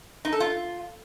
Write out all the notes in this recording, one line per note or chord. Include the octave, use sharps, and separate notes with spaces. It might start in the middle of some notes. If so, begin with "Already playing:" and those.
D#4
A4
F4